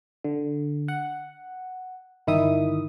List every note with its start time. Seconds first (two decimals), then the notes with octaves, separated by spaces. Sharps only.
0.24 D3
0.88 F#5
2.27 G1 D#3 E4 E5 D#6